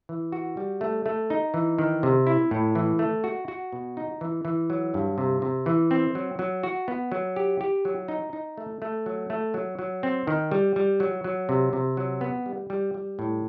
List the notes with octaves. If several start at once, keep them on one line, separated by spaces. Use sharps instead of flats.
E3
F#4
G3
A3
A3
D#4
E3
D#3
C3
E4
A2
E3
A3
F#4
F#4
B2
D#4
E3
E3
F#3
G2
C3
C3
E3
C4
F#3
F#3
F#4
B3
F#3
G4
G4
F#3
D#4
D#4
A3
A3
F#3
A3
F#3
F#3
C4
D#3
G3
G3
F#3
F#3
C3
C3
F#3
B3
G3
G3
G3
A2